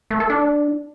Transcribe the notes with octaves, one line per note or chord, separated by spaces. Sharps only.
A3
A4
D4